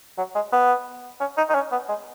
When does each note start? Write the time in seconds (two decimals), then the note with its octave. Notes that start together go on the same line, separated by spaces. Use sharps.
0.18 F#3
0.35 G#3
0.52 B3
1.20 C#4
1.37 D#4
1.49 D#4
1.55 C#4
1.71 B3
1.88 G#3